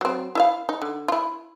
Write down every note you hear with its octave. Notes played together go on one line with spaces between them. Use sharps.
F#3 C4
E4 E5 F5
D#4
D3
E4 F4